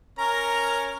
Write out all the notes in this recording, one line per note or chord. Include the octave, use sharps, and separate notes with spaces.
C#4 A#4 A#5